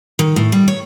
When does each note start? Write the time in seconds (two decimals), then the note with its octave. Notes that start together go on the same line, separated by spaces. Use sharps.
0.19 D#3
0.36 A2
0.52 G3
0.68 C#5